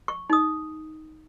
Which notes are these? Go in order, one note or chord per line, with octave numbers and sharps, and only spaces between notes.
C#6
D#4 D#6